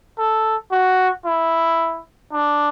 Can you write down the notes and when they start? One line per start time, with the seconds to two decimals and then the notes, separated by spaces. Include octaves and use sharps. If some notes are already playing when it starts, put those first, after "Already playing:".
0.18 A4
0.72 F#4
1.26 E4
2.33 D4